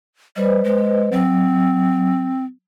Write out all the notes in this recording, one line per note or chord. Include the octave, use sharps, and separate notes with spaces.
G3 B4 C5 D#5
G#3
F#3 C4